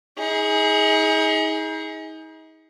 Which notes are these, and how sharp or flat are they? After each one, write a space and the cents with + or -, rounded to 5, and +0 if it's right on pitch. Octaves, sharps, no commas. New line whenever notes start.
D#4 +40 G#4 +0